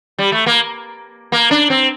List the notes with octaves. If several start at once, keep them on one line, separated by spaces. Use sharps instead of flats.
G3
A3
A#3
A#3
D4
C4